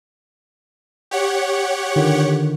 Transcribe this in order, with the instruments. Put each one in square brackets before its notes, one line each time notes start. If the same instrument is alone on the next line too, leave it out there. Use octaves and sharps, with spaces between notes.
[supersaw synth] G4 C#5 F#5
[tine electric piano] D3 D#3 F4